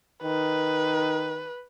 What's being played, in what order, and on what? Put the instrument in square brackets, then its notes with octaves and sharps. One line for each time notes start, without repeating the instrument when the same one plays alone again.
[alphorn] D#3 [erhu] B4